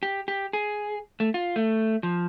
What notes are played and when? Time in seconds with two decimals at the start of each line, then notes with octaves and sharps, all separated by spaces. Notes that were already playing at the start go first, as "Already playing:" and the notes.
0.03 G4
0.28 G4
0.53 G#4
1.20 A3
1.34 F4
1.56 A3
2.03 F3